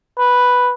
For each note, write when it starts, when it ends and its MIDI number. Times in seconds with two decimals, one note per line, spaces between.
0.19 0.73 71